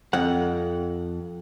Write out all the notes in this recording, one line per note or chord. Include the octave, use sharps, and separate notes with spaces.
F2 F#5